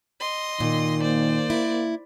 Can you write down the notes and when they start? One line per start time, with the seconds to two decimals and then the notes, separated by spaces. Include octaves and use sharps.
0.20 D#5 C6
0.60 A#2 D#3
1.02 A#3 C5 D5
1.50 E4